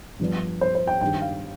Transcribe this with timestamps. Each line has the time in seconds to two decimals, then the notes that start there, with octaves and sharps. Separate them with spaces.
0.19 G2 F3 B3 D4
0.61 C5
0.75 C5
0.87 G5
1.01 G2 D#3 G3 G5
1.21 F5